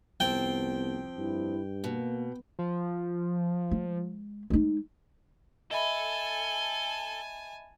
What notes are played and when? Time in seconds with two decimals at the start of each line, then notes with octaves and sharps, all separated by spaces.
0.20 C2 F2 F3 B3 C4 G5
1.17 G2 E4
1.84 B2 A#3
2.59 F3
3.71 G#3
4.50 G#3 D#4
5.71 A4 D#5 E5 G#5 A5 B5